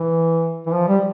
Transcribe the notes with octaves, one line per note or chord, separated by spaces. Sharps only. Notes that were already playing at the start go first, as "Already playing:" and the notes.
Already playing: E3
E3
F3
G3